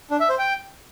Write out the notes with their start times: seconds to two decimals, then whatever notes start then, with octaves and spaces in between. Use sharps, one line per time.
0.11 D4
0.20 E5
0.29 C5
0.39 G5